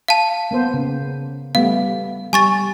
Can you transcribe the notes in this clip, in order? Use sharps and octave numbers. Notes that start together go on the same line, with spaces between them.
F5 A5
A#3 B3 C5
C#3
G3 A3 B3 F5
G3 G#5 C#6 A6